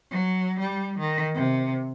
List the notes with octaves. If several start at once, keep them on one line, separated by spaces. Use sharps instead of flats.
F#3
G3
D#3
C3